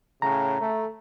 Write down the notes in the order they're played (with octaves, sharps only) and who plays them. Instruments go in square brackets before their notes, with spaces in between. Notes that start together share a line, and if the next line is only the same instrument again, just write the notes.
[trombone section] A2 C#3 [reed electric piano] A#5
[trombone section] A3